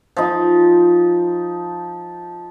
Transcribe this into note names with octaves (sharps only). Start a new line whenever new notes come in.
F3 D#4